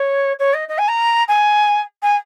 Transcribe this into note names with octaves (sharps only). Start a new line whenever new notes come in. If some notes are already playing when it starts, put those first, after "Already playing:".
Already playing: C#5
C#5
D#5
D#5
G#5
A#5
G#5
G#5